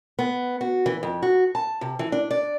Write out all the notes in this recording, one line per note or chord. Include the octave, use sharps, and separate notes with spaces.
B3
F#4
E3
F2
F#4
A5
C3
E3
D4
D5